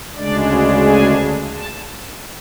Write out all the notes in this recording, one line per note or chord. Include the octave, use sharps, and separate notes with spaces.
D2 C#3 G#3 D4 D5
G#5
A5